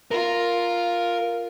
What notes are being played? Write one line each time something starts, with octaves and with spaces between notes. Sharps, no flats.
F4 A#4